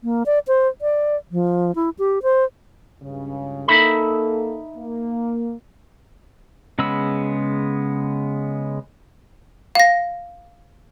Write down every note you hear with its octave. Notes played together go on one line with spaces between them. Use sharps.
A#3
D5
C5
D5
F3
E4
G4
C5
C#2 G2 C#3
A#3 D#4 A4 E5 B5
A#3
C#3 G#3 B3 B5 E6
F5 A#6